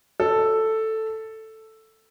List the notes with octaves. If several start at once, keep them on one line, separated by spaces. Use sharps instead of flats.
A4